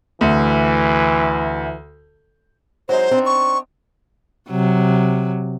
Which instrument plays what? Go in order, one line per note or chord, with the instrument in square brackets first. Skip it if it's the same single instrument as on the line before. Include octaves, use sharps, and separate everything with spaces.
[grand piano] D2 [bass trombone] E3
[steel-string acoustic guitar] F#3 G#3 D#4 [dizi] C5
[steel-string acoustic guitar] C4 D4 D#4
[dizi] C#6
[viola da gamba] C3 F#3